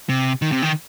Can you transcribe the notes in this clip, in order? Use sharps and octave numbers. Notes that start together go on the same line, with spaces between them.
C3
D#3
C3
D#3